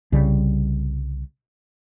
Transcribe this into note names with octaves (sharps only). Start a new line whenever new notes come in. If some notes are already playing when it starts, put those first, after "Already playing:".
C2 C#3 G3